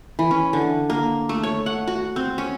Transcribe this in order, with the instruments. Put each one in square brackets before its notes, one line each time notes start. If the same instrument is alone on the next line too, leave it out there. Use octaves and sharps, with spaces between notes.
[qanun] E3
C#4
D3
A#3
A3
C#5
F#5
F#4
C4
C#4